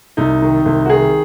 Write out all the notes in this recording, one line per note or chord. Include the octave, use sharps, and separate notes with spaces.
C2 D#4
D#3
C2
F#4
D#3 G#4